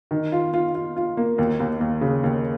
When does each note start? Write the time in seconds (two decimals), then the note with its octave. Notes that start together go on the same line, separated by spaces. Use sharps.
0.11 D#3
0.32 F4
0.54 F4
0.75 F4
0.96 F4
1.17 A#3
1.38 D#2
1.60 D#2
1.81 D#2
2.01 C#3
2.24 D#2